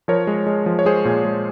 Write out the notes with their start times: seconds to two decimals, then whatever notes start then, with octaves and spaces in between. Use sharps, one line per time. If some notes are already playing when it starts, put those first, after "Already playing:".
0.08 F3 A#4 C#5
0.27 G#3
0.47 G#3
0.66 F3
0.79 C#5
0.85 G#3 G#4 C5
1.05 A#2
1.25 G#3